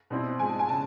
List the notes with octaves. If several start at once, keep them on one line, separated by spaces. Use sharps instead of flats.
B2 G3 C4 E4
G#2 F3 G#3 G#5
A5
G#5
C#3 A5